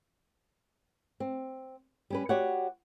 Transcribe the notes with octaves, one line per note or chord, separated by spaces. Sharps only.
C4
G3 C#4 B4
F#4 G4 C#5 D5 F#5